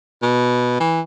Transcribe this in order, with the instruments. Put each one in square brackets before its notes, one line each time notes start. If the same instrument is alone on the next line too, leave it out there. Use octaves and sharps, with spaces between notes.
[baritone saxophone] B2
E3